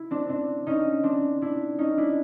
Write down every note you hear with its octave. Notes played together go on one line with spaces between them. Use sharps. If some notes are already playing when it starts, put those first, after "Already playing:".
Already playing: E4
C4 D4
C4 D4
C#4 D#4
C4 D4
D4 E4
C#4 D#4
D4 E4